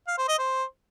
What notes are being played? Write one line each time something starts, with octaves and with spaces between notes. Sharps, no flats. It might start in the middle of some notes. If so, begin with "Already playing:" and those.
F5
C5
D#5
C5